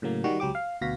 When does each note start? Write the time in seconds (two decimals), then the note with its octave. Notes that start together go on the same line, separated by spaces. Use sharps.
0.02 A2 C#3 F#3 A#3
0.24 D#3 G3 F#4
0.40 C#2 F#3 G4 D6
0.55 F5
0.81 D2 B2 F#4 F5 A#6 B6